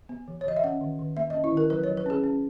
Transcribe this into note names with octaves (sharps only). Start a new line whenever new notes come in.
B3
E3
C#5
E3 D#5
E5
C#4 F#5
D#3
D#3
A#3 E5
D#5
C#4
E4
D#3 A#4
F#3 B4
C#5
F#3
B4
C#4 G#4
C#4